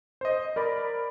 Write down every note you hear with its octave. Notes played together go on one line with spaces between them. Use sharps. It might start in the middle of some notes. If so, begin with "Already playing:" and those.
C5 D#5
A#4 D5 B5